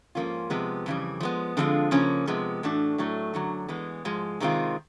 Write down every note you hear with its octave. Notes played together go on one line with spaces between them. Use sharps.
G#2 F3 A#3 C#4 F4
C3 F3 G#3 B3
F2 C#3 E3 G3
F3 G#3 B3
D3 F3 G#3 C4 F4
C#3 F3 A#3 C#4
C3 F3 G#3 B3
A2 E3 A3 D4 F#4
A2 F#3 A3
F#2 D3 F#3
E3 G#3 B3
G#2 F3 G#3
C3 D#3 G#3 C4 F4